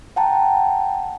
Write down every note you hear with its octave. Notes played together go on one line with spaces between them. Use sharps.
F#5 G5 A5 A#5